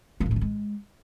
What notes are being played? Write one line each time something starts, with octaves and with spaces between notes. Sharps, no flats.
A#3
A2
A3
D3
G#3